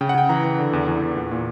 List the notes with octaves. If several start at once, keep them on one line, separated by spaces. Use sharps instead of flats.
C#3 G5
F#5
C#3 G5
E3 A#5
E3
D3
E2
E2
E2
A#2
A#2